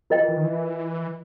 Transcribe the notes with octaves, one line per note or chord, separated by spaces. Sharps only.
F3 F4 A#4 D#5 G5
E3
E3
D#3
E3